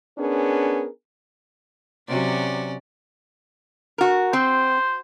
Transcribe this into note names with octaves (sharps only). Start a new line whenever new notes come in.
B3 C#4 D4 G#4 A#4
C3 F#3 C#4 F#4 D5
F#4 A#4
C4 C5